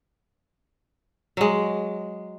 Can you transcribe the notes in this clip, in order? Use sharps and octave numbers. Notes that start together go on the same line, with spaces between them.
F#3 G#3